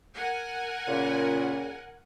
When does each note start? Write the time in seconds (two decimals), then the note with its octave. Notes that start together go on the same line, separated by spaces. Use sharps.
0.17 A#4 F#5 G#5
0.88 A#2 C#3